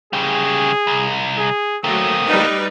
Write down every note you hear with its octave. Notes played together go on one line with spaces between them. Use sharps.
C#3 G3 G#4
C2
G#4
F#3 A3 A#3 C4 D#6
G3 D#4 B4